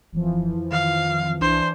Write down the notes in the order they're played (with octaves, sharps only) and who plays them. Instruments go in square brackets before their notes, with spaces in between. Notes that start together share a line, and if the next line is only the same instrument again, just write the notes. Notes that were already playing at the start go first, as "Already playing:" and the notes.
[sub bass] D1 [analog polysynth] F2 E3 F3
[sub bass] D#3 [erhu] F5
[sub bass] C2 [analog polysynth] E3 D4 [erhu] C5